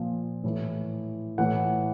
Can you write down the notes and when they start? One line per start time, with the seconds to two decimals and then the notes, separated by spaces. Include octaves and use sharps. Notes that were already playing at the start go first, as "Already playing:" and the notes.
Already playing: A#2 F3
0.44 A2 E3
1.38 A2 E3 F#5